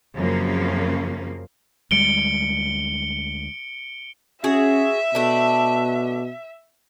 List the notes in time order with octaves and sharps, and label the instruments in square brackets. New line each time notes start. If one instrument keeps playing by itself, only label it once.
[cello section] F#2 C#3 F3 A#3 C4
[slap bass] D2 G3 G#3 [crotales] C#7 D7 G7
[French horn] C#4 [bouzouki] F#4 G#4 [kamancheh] E5
[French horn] B2 [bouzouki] A3 D4